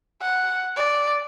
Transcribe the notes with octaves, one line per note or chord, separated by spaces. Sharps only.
F#5
D5